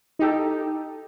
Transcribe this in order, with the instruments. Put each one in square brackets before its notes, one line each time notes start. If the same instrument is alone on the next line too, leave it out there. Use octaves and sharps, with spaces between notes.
[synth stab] D#4 G4 A4